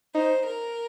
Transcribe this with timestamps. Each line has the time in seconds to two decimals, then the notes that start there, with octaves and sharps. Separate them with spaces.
0.15 D#4 C5
0.47 A#4